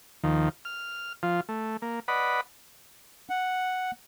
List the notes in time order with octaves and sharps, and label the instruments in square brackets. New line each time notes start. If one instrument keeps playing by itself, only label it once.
[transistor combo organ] D#2 D#3 F3
F6
F3 F4
A3
A#3
B4 D5 D#5 F#5 B5
[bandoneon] F#5